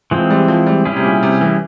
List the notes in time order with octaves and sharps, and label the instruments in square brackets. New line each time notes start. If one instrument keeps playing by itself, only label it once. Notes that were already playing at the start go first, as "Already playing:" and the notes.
[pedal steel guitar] E3 G#3 C4 [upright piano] F3
[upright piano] G3
F3
G3
[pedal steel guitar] G3 C#4 E4 G#4
[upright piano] C3
A#2
C3
E3